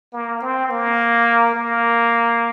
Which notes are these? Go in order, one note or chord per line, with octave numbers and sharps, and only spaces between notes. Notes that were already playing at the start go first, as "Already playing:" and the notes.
A#3
C4
A#3
A#3